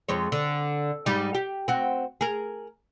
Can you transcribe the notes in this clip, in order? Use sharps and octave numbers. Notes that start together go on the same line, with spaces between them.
F2 G#3 C#5
D3
G#2 G3 D#4
G4
C4 F#4
G#4 A#4